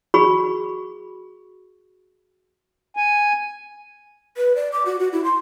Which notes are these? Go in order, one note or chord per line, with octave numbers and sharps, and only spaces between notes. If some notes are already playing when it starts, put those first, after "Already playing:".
F#4 G#4 B5 C#6
G#5
B4
D5
D6
F#4
F#4
E4
C6